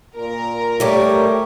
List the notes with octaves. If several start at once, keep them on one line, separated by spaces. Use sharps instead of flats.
A#2 A#4
G3 A3 G4 C#5